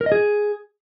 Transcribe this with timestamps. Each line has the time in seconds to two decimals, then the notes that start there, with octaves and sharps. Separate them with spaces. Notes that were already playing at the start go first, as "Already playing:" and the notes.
0.01 A#4
0.06 D#5
0.12 G#4